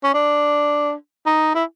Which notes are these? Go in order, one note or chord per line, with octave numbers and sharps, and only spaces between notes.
C#4
D4
D#4
E4